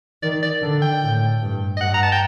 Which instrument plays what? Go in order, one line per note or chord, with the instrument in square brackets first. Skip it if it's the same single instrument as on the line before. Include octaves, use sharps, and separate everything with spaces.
[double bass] D#3 [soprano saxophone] D5
[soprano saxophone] D5
[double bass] D3
[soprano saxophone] G5
[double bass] A2
G2
[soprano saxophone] D#5
[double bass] G2 [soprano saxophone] F#5
[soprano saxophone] A#5
A5
G5